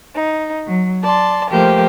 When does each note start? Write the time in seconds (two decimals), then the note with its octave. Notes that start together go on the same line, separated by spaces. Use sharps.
0.15 D#4
0.66 F#3
1.04 D5 A5 C6
1.50 F3 A3 A#3 G4 C5